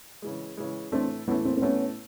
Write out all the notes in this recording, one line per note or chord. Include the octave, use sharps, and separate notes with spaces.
C#3 E3 G#3
C#3 E3 G#3
A2 E3 A3 C4 D4
A2 E3 A3 B3 C#4
A#3 C4
C4
A2 E3 A3 B3 C#4